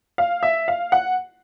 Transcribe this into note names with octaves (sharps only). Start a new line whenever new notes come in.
F5
E5
F5
F#5